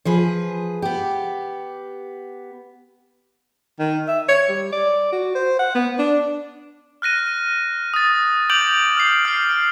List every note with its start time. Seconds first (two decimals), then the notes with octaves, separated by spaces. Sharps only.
0.05 F3 G#4 B4
0.82 B3 G4
3.79 D#3
4.08 E5
4.28 C#5
4.49 G3
4.72 D5
5.12 F#4
5.35 C5
5.59 F#5
5.75 B3
5.99 D4
7.02 F6 F#6 A#6 D#7
7.94 D#6 A6
8.50 D6 G6 D7 F7 F#7
8.97 F6 C7
9.25 F6 C7